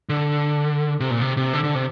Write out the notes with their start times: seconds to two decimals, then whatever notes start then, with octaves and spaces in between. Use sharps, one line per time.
0.09 D3
1.00 C3
1.10 A#2
1.21 C3
1.37 C3
1.53 D3
1.64 D3
1.75 C3